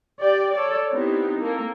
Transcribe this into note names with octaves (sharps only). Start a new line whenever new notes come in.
G4 D5 G5
A4 C#5 D5
B3 C4 D#4 E4 G4
A#3 C4 A4